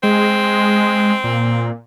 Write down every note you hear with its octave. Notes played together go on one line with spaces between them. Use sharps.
G#3 C4
A#2
A#2